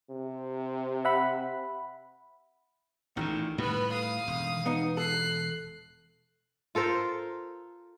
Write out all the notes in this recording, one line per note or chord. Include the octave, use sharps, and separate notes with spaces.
C3
E5 F#5 B5
A1 A#2 D#3 A3
A2 G3 B3 B4
F5 D#6
E1
B3 D#4
A4 F#6 C7
F4 A4 A#4 C5